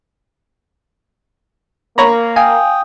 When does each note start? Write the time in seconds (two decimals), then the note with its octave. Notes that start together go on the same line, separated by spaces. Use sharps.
1.98 A#3 C#5 A#5 B5
2.36 F5 G5 G#5 D#6